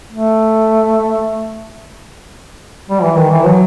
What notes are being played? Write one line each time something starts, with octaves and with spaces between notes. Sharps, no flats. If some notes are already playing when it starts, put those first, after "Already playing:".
A3
G3
E3
D#3
E3
F#3